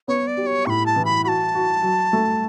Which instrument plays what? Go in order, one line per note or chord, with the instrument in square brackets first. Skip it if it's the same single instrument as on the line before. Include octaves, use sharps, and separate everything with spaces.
[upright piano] B3 [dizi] C#5
[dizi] D5
[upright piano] G4
[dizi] C#5
[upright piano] A2 [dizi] B5 C#6
[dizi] A5
[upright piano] E3
[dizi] B5
[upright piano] F#4 [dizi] B5
[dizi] A5
[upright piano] F#4
F#3
A3